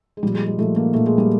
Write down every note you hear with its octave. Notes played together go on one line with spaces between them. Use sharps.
G#3
A#2 F3 G3
G#3
G#3
A#2 F3 A3
A#3
A#2 F3 A3
G#3
G3